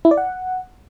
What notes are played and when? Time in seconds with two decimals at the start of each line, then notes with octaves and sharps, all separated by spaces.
0.05 E4
0.11 D5
0.17 F#5